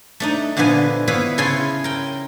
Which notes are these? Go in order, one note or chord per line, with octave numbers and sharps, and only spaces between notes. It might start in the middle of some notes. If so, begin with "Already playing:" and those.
A3 D4 D#4
A#2 D3 F3 B3 B4 G#5
B3 E4 B4 C#5 E5 F5
C#3 E4 C#5 G#5 A5 C6
A#4 G5